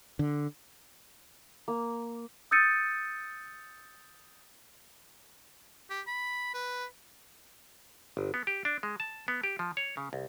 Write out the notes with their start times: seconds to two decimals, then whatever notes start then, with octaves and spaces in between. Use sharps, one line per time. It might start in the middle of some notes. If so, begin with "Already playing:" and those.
0.19 D3
1.68 A#3
2.51 D#6 E6 G6 A6 C#7 D#7
5.90 G4
6.07 B5
6.54 B4
8.17 G1
8.34 B3
8.47 G4
8.65 D4
8.83 G#3
9.00 A5
9.28 B3
9.43 G4
9.59 F3
9.77 C#5
9.97 C#3
10.13 C2